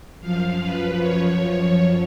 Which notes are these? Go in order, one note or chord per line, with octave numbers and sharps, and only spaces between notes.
F#2 F3 F5
B4
C#5